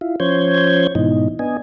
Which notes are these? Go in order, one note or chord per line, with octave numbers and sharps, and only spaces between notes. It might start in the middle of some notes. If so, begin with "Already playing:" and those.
E4 F4
F3 C#4 C5 C#5 G6 G#6
G#2 B2 E3 D#4
B3 D4 D#5 G#5